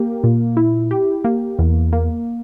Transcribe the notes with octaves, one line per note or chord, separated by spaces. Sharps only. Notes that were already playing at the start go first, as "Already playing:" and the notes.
Already playing: A#3 G4
A#2
E4
G4
A#3
E2
A#3